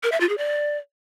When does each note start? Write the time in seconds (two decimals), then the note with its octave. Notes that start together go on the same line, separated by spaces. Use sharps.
0.03 A#4
0.12 E5
0.20 F4
0.29 G#4
0.38 D5